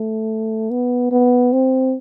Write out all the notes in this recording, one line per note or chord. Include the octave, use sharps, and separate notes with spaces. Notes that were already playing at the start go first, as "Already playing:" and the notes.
Already playing: A3
B3
B3
C4